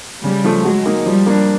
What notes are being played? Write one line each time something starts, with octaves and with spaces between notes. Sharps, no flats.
C#3 G3
F3 A3
F#3 G#3
A#3 D#4
F3 G3
A#3 D4